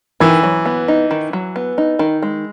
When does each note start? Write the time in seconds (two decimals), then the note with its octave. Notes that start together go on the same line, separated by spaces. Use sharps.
0.20 D#3 E3
0.43 F#3
0.66 B3
0.88 D#4
1.11 D#3
1.33 F#3
1.56 B3
1.78 D#4
1.99 D#3
2.22 G#3